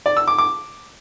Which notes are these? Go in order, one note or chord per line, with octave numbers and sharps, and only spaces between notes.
D5
E6
D6
D6